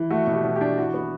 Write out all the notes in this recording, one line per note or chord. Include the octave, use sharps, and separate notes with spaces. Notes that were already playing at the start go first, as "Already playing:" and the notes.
Already playing: E3
A3 F#4
B2
G4
B2
G4
D4
E3 F#4
B3